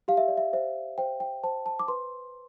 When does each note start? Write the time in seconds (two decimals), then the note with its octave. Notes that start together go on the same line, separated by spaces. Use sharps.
0.08 G4 F5
0.17 E5
0.28 D5
0.37 E5
0.53 C5 E5
0.98 C5 G5
1.20 G5
1.44 C5 A5
1.66 A5
1.79 D6
1.88 B4 C6